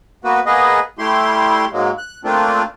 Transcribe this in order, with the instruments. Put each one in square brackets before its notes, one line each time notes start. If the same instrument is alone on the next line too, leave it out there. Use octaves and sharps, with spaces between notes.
[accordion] A#3 B3 F#4 B4
A#3 B3 G#4 B4 D#5
G3 A3 E4 G4 C6
G#2 F#3 G#3 A#3
F#6
A3 A#3 C4 D4 F4